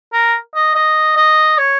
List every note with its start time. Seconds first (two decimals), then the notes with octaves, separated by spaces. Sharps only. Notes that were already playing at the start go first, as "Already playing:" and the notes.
0.13 A#4
0.55 D#5
0.75 D#5
1.16 D#5
1.58 C#5